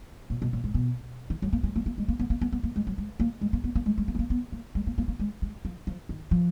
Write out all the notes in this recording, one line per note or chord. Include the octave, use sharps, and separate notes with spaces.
A#2
B2
A#2
G#2
B2
D#3
F#3
A#3
G#3
A#3
A#3
G#3
A#3
B3
A#3
B3
B3
A#3
G#3
F#3
G#3
A#3
G#3
A#3
B3
A#3
G#3
G#3
A#3
B3
A#3
B3
A#3
G#3
A#3
A#3
A#3
G#3
G#3
F3
F3
D#3
F3